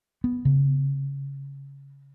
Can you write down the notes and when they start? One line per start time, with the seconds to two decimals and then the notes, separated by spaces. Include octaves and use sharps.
0.24 B3
0.45 C#3